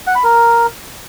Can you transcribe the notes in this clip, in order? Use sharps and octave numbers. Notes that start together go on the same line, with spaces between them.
F#5
B5
A#4